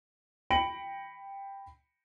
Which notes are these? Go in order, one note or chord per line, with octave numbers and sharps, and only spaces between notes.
G5 B5 A#6 C#7 D7 F#7